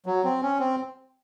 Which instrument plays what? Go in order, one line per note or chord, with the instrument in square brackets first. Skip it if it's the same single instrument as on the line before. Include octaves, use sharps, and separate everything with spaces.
[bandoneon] F#3
C4
C#4
C4